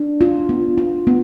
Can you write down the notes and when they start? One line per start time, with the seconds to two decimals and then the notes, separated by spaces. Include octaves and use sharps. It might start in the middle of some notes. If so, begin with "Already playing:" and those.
Already playing: D4
0.21 F4
0.49 B3
0.78 F4
1.07 B3